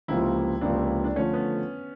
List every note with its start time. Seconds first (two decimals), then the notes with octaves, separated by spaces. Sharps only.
0.08 C#2 C3 F3 A#3 E4
0.61 C#2 C3 F3 A#3 D4
1.04 D4
1.15 D3 F3 A3 C#4
1.33 B3